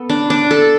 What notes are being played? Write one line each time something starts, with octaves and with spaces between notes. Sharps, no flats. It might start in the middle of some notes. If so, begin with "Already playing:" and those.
Already playing: B3 A4
D4
D4
A4